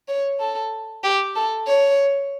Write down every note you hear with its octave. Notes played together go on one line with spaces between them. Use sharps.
C#5
A4
G4
A4
C#5